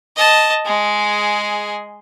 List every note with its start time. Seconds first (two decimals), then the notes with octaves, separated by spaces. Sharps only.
0.16 D#5 A5
0.65 G#3 G#4